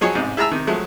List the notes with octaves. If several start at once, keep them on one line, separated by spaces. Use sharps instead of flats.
F3 F#3 G#4 C#5 D#5 G#5
A1 G#2 C3
E4 G#4 A5 A#5 E6
C3 D#3
F3 F#3 G#3 A3